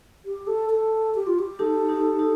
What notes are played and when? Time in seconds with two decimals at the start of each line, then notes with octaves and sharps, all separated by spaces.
0.25 G4
0.47 A4
0.70 A4
1.15 G4
1.27 F4
1.39 G4
1.59 D#4 G4 A4
1.89 D#4 G4
2.19 D#4 G4